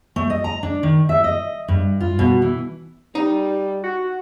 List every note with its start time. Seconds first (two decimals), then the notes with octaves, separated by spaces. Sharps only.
0.16 A3
0.30 D#5
0.44 A#5
0.63 D4
0.83 D#3
1.09 E5
1.24 D#5
1.68 G2
2.00 F4
2.19 B2
2.42 E3
3.15 G3 D#4
3.83 F#4